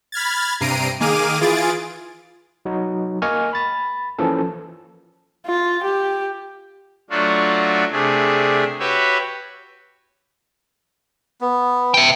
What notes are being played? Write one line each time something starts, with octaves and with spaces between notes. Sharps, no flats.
B5 F6 G#6 A6
G2 C3 A#5 C7 D7 D#7
D#3 A#3 G#4 D6 F6 D#7
E3 F4 G#4 A6 D7
F#3 D#4 F#4
A#3 D#5 G#5 C#6 F6
B5 A6
E3 F3 A#3 C#4 A4
F4
G4
F#3 A3 D4 F4 F#4
C3 A3 D4 G#4
F#4 G4 B4 C#5 E5
B3
E5 G5